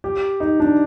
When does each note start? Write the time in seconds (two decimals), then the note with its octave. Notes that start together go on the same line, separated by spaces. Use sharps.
0.04 G4
0.40 D#4
0.60 D4